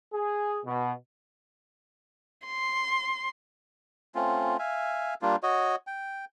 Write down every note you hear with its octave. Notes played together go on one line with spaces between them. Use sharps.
G#4
B2
C6
A3 C4 C#4 F4
E5 F5 G#5
G3 A#3 D4 F4
F#4 C#5 D#5
G5